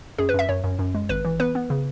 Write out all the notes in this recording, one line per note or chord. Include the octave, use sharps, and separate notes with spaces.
F#2 G#4
B4
F#2 E5
F#2 C#5
F#2
F#2
G#3
G#1 B4
E3
B3 B4
B3
C#3